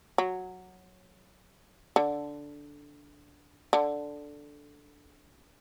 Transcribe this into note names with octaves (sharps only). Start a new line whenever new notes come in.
F#3
D3
D3